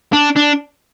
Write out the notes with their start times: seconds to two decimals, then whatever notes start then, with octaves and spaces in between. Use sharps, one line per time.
0.13 D4
0.36 D4